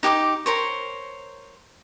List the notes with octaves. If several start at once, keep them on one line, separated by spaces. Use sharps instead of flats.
D#4 G4 G5 D6
A#4 C5 C#5